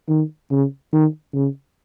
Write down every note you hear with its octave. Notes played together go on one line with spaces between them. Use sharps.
D#3
C#3
D#3
C#3